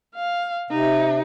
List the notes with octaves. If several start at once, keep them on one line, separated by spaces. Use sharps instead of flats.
F5
C3 D#4 G4